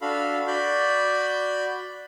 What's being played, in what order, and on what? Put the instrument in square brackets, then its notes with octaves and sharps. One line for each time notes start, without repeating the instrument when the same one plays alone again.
[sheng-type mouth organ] D4 F#4 A4 F5 B5
F#4 D5 B5 G6